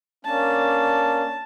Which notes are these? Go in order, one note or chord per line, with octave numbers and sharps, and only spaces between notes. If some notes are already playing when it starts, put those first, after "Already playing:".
A#3 C#4 D4 A5